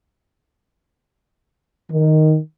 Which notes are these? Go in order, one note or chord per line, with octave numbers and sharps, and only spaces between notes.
D#3